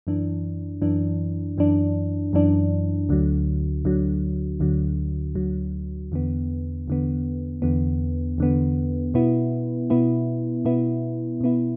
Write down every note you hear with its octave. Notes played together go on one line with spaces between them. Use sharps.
F#2 E3 D4
F#2 E3 D4
F#2 E3 D4
F#2 E3 D4
D2 D3 F#3
D2 D3 F#3
D2 D3 F#3
D2 D3 F#3
E2 D3 B3
E2 D3 B3
E2 D3 B3
E2 D3 B3
B2 B3 E4
B2 B3 E4
B2 B3 E4
B2 B3 E4